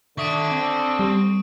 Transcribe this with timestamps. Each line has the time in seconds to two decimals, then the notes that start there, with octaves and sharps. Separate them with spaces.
0.18 D3 D#3 E5 C#6 D#6 D7
0.51 C4
0.99 G3